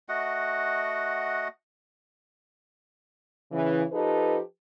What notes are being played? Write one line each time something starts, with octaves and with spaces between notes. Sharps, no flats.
A3 F#4 D#5 F#5
C#3 E3
F3 D#4 G4 A4 B4